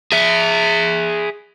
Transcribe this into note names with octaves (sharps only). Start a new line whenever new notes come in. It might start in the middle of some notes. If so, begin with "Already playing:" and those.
G#4 E5